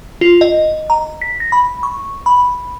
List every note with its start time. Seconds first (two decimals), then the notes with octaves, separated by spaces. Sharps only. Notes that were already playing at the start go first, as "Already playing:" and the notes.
0.21 F4
0.41 D#5
0.90 A#5
1.22 B6
1.40 A#6
1.52 B5
1.83 C#6
2.26 B5